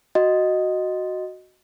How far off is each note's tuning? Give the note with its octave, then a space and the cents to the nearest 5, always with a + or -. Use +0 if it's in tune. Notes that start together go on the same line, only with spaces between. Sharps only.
F#4 +0 D#5 +0